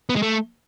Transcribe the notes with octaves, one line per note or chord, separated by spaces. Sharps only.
B3
G#3
A3